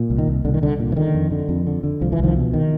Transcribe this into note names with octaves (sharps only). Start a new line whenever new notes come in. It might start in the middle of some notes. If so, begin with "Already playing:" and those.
Already playing: A#2
C2
D#3
C2
C2 D3
D#3
C2 D3
A#2
E3
D3 D#3
F2
D3
F2
D3
D3
C2 F3
E3
C2
D#3 F3
B2
D#3